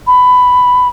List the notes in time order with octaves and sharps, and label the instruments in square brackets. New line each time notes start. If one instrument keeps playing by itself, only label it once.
[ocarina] B5